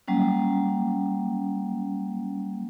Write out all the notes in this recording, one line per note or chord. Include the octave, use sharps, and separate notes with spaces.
F#3 G3 A#3 C#4